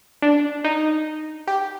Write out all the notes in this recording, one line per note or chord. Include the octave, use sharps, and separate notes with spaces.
D4
D#4
G4